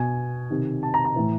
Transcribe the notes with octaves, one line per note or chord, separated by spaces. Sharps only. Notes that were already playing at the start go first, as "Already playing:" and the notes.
Already playing: B2 G#5
C3 D#3
A5
A#5
A#5
A2 E3